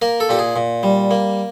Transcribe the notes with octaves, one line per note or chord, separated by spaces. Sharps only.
A#3 A#4
A4
A#2 G4
G#4
A#2
G3
A#3